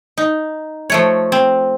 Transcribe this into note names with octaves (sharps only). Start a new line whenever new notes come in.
D#4
F3 A3 C#5
C4